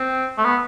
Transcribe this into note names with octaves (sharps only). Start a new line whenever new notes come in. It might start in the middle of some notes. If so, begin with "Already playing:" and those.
Already playing: C4
A3
B3